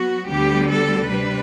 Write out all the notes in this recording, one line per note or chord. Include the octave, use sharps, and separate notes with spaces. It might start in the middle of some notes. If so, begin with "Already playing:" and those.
Already playing: F#3 B3 F#4
D2 D3 G3 B3 G4
A4
C3 G3 D4 B4